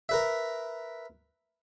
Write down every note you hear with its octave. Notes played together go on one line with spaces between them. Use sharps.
A#4 B4 E5